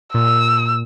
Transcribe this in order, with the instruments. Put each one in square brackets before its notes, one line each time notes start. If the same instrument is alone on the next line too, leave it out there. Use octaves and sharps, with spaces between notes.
[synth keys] A#2 [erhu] E6